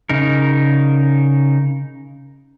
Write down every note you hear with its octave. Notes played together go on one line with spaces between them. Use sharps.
C#3 D#4 A#4